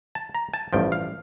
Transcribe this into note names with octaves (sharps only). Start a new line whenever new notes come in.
A5
A#5
A5
A1 G2 F3 G5
F5